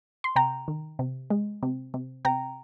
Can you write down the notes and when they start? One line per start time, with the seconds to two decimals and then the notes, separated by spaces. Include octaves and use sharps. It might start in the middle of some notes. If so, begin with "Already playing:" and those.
0.24 C6
0.36 C3 G5 A#5
0.68 D#3
0.99 C3
1.30 G#3
1.63 C3
1.94 C3
2.25 C3 G5 A#5